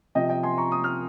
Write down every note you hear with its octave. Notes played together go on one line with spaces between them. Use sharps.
C3 F3 D#5 G5
D#5 G5
G#5 C6
A#5 C#6
D#6
F6